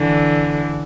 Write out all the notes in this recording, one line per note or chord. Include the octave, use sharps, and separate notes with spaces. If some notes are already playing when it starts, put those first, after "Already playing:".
Already playing: D3 E3